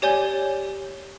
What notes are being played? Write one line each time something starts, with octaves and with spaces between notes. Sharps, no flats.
G4 C#5 D5 G#5 G6 G7